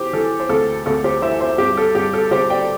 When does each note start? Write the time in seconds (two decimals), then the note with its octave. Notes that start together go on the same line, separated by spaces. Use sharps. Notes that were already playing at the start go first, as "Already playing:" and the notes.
Already playing: E3 G4 C5
0.13 E3 A4
0.40 C5
0.49 D2 A4
0.86 D2 A4
1.04 G4 C5
1.22 E3 C5 E5
1.40 C5 E5
1.58 G2 G4
1.77 A4
1.95 G2 G4
2.14 A4
2.31 G1 G4 C5
2.50 D5 G5